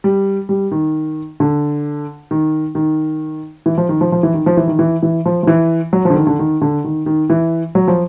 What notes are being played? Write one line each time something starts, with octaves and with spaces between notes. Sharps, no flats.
G3
G3
D#3
D3
D#3
D#3
E3
F3
D#3
F3
F3
E3
D#3
F3
E3
D#3
E3
E3
F3
F3
E3
F#3
F3
D3
D#3
D3
D#3
D3
D#3
D#3
E3
F#3
F3